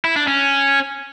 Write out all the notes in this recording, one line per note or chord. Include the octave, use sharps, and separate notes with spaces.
E4
D4
C#4